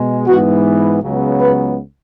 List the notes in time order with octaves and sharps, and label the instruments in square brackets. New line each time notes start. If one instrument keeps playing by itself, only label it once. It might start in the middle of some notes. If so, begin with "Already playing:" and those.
Already playing: [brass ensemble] B2 G#3
G#2 E3 B3 F#4
C#2 C#3 F#3 B3
B4